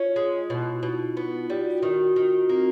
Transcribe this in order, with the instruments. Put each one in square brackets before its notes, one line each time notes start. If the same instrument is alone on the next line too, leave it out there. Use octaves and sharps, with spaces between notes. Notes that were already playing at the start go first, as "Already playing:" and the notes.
Already playing: [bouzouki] C#4 [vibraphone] F4
[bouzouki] G#3
[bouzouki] B2 [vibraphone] E4
[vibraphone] F4
E4
[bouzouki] B2 [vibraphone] D#4
[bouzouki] B3 [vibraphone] F4
[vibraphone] F4
[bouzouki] G3
[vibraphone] F#4
[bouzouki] D#3 [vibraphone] F#4
[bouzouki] D#3 [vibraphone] F4
[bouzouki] A#3 [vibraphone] C4